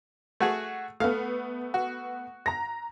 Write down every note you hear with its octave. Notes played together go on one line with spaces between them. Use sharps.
A3 F#4 G#4
A3 B3 F5
F#4
A#5 A#6